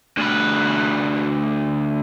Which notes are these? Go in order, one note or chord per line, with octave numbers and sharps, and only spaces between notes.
D2 B4